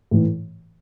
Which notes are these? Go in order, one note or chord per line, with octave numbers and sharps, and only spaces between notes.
A2 E3